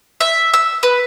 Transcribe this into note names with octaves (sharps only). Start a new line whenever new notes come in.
E5
E6
B4